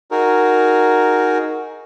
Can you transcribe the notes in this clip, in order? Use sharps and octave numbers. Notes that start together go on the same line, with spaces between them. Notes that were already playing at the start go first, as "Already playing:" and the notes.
D#4 F#4 G#4 A#4